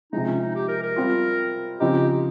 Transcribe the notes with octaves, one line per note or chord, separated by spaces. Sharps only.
C3 F3 G#3 D#4
C#4
D#4
G4
A#4
A#4
G3 C4 F4
C#3 F3 C4 D#4 G4